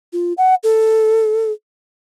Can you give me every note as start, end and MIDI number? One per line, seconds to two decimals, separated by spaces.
0.13 0.33 65
0.38 0.55 78
0.63 1.52 69